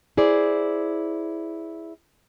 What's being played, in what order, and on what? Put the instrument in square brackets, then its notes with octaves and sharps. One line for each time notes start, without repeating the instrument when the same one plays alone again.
[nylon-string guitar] E4 G#4 C5 D5